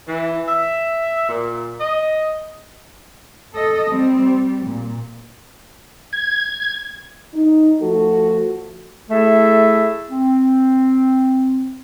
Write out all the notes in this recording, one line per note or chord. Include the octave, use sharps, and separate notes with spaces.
E3
E5
A#2
D#5
A4 D#5
G3 C4
G3
A#2
G#6
D#4
F3 A3 F#4 A4
A3 E4 G#4 A4 E5
C4